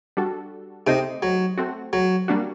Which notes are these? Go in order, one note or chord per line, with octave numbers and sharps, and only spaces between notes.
G3 D4 F#4 A4
C3 A3 D#4 G4 C5 D#5
F#3
A3 C4 F#4
F#3
G3 A#3 D4 F#4